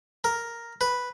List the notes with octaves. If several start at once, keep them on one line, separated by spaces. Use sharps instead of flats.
A#4
B4